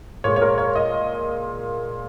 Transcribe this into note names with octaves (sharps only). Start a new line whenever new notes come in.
A#2 G#3 C#5
C#5
A#4
C#5
D#5